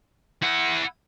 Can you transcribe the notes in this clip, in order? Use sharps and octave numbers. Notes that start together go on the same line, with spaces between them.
E4 F#5